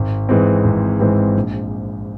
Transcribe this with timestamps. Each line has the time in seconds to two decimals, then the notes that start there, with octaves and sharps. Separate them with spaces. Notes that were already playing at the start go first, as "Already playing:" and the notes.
Already playing: G#1
0.29 G#2 E3 G#3 C4
0.64 G#1
1.00 G#2 E3 G#3 C4
1.36 A#1